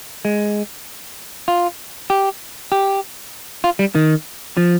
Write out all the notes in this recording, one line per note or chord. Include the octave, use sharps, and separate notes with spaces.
G#3
F4
G4
G4
F4
G3
D#3
F3